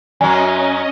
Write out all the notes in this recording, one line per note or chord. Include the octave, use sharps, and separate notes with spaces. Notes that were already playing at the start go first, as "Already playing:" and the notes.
F#2 F#3 C#4 D#5 G#5